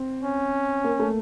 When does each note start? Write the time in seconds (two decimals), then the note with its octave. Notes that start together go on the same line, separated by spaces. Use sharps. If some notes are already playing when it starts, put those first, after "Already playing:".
Already playing: C4
0.23 C#4
0.84 A#3
0.99 A3